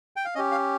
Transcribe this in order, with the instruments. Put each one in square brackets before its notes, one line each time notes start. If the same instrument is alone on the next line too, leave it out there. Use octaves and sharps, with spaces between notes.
[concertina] G5
F5
C#4 G4 D#5
F5